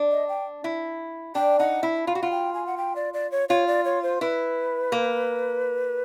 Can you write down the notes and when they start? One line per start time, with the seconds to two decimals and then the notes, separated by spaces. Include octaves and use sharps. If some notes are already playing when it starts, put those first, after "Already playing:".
Already playing: D4
0.11 D#5
0.29 G5
0.64 E4
1.35 D4 G5
1.59 D#4 F#5
1.83 E4
2.07 F4 F5
2.15 F#4
2.23 F4 F#5
2.31 G5
2.54 G#5
2.66 F#5
2.78 G5
2.96 D5
3.14 D5
3.32 C#5
3.49 F4 C#5
3.67 D5
3.85 C#5
4.03 C5
4.21 E4 B4
4.92 A#3